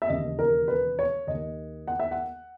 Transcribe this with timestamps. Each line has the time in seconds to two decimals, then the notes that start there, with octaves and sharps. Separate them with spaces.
0.02 E5
0.08 E1 D#2 C#3 D#5
0.39 A#4
0.68 B4
0.99 C#5
1.27 D#2 D#3 A#3 D#5
1.88 F#5
2.00 E5
2.11 F#5